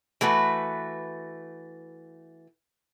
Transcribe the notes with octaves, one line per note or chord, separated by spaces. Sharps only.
E3 A3 F#4 B4